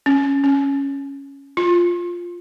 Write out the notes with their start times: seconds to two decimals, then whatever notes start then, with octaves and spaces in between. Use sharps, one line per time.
0.06 C#4
0.44 C#4
1.57 F4